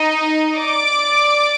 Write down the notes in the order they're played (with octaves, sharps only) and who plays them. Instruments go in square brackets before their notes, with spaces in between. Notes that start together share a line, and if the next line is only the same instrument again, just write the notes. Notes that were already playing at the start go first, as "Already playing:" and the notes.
Already playing: [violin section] D#4 D#5
D5 D6